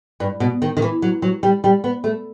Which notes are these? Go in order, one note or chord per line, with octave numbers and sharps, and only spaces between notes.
G2
B2
D#3
D#3
E3
F#3
F#3
G3
G3
B3
A3